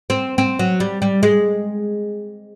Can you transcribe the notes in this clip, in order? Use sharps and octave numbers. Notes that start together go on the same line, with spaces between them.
C4
C4
F#3
G3
G3
G#3